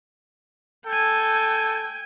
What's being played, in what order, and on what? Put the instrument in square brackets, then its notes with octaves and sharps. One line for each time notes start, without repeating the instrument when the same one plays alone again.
[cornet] A4 [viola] G5 G#5